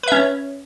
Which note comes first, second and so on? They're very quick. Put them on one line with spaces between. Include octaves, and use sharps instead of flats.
B4 E5 C#4 C#5